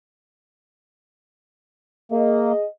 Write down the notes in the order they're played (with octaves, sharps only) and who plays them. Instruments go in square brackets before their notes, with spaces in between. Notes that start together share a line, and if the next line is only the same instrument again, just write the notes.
[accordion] A#3 [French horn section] G#4 D#5